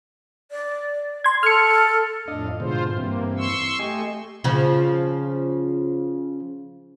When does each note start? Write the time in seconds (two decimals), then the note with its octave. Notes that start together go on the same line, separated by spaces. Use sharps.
0.51 D5
1.24 C6 G#6
1.43 A4 F6 C#7
2.28 F2 A2 D4 D#5 F5
2.60 G#2 B2 D3 F4 C5
2.97 G2 E3 A#3 C4
3.38 C6 C#6 E6
3.79 A3 G4 D#5 G#5
4.44 C#3 F3